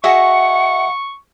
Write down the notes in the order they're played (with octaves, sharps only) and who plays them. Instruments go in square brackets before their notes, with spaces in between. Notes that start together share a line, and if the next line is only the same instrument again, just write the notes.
[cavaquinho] F#4 G#4 D#5 [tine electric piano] E5 [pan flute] F#5 [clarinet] C#6